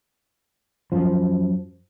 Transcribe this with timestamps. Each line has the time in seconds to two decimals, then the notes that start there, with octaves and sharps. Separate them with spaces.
0.92 F#2 F3